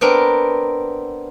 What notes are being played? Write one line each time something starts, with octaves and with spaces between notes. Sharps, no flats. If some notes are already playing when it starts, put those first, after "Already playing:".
B3 C4 D4 A#4